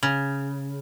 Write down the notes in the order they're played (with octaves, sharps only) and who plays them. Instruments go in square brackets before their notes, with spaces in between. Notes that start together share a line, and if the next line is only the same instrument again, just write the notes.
[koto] C#3